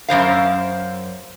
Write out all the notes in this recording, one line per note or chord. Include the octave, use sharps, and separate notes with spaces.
F#2 D#3 C5 F5